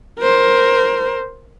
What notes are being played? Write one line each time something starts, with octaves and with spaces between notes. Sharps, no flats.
A#4 C5